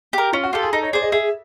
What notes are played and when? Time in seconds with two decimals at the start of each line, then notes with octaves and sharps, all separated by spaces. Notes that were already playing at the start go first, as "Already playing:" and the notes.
0.13 G4 A#4
0.33 C#4 F4
0.44 F#4
0.53 F4 G4 A4
0.63 G#4
0.73 D#4 A4
0.83 C#5
0.93 G#4 C5 D5
1.02 D#5
1.12 G#4 E5